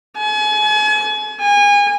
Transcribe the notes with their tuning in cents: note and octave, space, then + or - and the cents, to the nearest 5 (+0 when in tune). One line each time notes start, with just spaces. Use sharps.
G#5 +40
G#5 -30